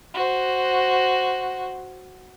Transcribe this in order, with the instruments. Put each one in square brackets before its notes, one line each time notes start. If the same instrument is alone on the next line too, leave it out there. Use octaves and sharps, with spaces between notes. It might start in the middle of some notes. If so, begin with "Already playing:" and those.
[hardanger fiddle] F#4 C5